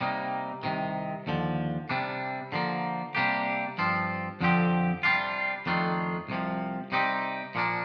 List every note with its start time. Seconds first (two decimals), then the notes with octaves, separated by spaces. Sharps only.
0.01 C3 G3 A#3 D#4
0.63 C2 C3 D#3
1.27 D#2 D3 F3
1.89 C3 G3 D4
2.52 D3 F3 A#3
3.15 C3 G3 A#3 D4 G4
3.78 G2 F3 C4 F4
4.41 F2 D3 F3 C4 G4
5.03 C3 G3 D4 F4
5.66 F2 D#3 A3 D4 F4
6.29 C2 C3 F3
6.92 C3 G3 C4 D#4 G4
7.55 A#2 F3 A#3 D4